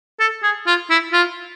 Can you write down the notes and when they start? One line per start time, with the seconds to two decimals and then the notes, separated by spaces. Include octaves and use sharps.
0.20 A4
0.43 G#4
0.67 F4
0.90 E4
1.13 F4